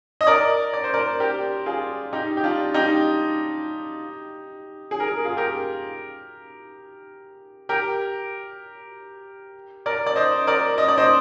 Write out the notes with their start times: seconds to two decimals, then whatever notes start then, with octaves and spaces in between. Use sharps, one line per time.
0.21 D#5
0.27 A#4 D5
0.73 D5
0.84 C5
0.94 A#4 D5
1.20 G4 A#4
1.66 F4 G#4
2.13 D#4 G4
2.37 G4
2.43 D4 F4
2.74 D#4 G4
4.91 G#4
5.00 A#4
5.08 G#4
5.16 A#4
5.25 F4 G#4
5.37 G4 A#4
7.69 G4 A#4
9.86 A#4 D5
10.06 D5
10.16 C5 D#5
10.47 A#4 D5
10.78 D#5
10.88 D5
10.98 C5 D#5